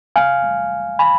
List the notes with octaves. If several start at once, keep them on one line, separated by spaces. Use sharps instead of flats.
F5 G#5
G#5 B5